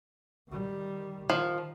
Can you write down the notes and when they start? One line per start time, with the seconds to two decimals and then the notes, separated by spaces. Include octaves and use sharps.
0.48 D#3 G3
1.30 D#3 F3